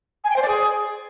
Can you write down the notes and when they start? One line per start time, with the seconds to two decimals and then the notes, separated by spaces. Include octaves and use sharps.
0.24 G#5
0.30 G5
0.36 C5
0.42 D5
0.48 G#4